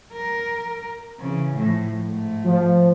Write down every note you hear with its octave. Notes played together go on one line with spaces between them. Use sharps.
A#4
C#3 E3
A2 F3
G#2 A3
F3